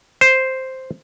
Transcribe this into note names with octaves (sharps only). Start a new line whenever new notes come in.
C5